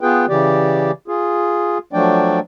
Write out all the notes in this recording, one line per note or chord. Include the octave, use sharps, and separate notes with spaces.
B3 F4 G#4 B4 G5
C#3 E3 G4 D5
F4 G#4
F3 F#3 A3 D4 D5 G5